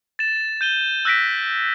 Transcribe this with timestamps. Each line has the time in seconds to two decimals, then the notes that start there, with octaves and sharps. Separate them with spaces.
0.19 A6 E7
0.61 G6 D#7 G7
1.05 E6 F#6 A#6 B6 D7